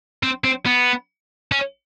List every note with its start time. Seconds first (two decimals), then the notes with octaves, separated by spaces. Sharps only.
0.23 C4
0.44 C4
0.66 B3
1.52 C#4